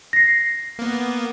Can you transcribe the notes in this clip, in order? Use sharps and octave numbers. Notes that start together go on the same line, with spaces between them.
A#6 C7
A#3 B3